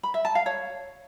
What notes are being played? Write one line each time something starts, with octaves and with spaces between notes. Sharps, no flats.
B5
E5
A5
F5
C#5